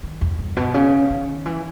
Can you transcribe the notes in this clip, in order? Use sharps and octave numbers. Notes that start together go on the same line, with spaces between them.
D#3
E2
G2
B2
C#3
D#3
E3